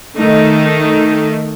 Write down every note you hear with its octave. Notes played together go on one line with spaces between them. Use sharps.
D#3 A3 D#4